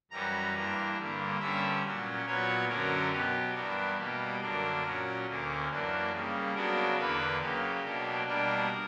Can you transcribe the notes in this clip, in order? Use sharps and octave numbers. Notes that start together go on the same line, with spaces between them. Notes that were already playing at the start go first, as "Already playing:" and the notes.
F#2 E3 G3 C#4 A#5
G2 E3 A#3 D4
G2 D3 G3 A#3
G2 D3 G3 C#4 E5
A#2 F#3 C#4
A#2 F#3 B3 C#5
F#2 D3 F#3 C#4 A#4
B2 F#3 B3 G4
G2 E3 B3 D4 A#4
B2 G3 A#3 G4
F#2 D3 A#3 D4 A#4
A#2 F#3 C#4
D2 D3 A#3 C#4
F#2 E3 A#3 D4
C#3 G3 A#3
C#3 F#3 B3 D4 A#4
E2 D3 A#3 B4
C#3 F#3 A#3 G4
B2 F#3 A#3 D4
B2 G3 A#3 D4 A#4